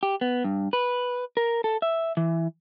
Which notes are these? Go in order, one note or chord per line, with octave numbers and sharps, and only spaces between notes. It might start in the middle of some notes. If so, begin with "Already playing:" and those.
G4
B3
G2
B4
A#4
A4
E5
E3